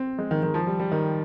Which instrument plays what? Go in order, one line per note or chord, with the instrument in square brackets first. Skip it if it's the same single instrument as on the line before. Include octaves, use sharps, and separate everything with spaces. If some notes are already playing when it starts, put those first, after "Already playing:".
Already playing: [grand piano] C4
G#3
D#3
D#3
F3
G3
G3
D#3